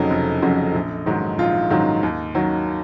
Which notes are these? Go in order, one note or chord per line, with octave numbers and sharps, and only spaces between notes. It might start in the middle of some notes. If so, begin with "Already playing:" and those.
Already playing: F1 F2 C#3 F#3 D#4
F1
F2 C#3 F#3
A#1
G#2 D#3 F#3
A#1 F4
G#2 D#3 F#3
D#2
D#3 F#3